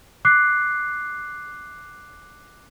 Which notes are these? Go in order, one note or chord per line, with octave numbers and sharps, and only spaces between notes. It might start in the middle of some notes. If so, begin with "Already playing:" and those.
D6 F#6 C7